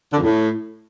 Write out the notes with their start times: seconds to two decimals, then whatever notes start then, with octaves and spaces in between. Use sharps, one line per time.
0.12 D3
0.18 F2
0.23 A2